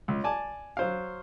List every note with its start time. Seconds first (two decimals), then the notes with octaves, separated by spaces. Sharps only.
0.08 C#2
0.24 D5 G#5 A5
0.77 F#3 C5 F5